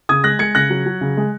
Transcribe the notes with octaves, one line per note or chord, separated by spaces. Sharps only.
C#3 D#6 G#6
G#3 F#6 A#6
G#3 G#6 C#7
C#3 F#6 A#6
F#3
F#3
C#3
G#3